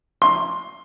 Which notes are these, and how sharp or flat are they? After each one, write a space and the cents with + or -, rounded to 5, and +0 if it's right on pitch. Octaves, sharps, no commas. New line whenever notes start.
C6 +10